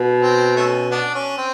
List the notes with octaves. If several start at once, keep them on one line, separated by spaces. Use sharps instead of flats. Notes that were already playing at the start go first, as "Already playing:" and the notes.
Already playing: B2
C4
A3 C#4
B3 D4
C#4
C4